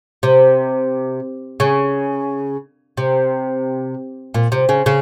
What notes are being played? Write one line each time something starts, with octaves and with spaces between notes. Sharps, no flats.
C3
C#3
C3
A#2
C3
C#3
C#3